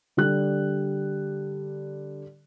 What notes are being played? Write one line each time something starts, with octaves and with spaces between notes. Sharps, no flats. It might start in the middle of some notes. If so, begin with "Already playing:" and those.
D3 G3 F#6